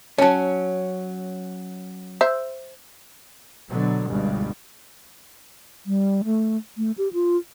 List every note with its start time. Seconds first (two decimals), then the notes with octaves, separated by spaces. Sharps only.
0.18 F#3 C#4 C#5 A5
2.21 C5 E5
3.69 B2 D3 F#3
4.08 G1 C#2 G2 B2
5.86 G3
6.25 A3
6.77 A3
6.98 G4
7.13 F4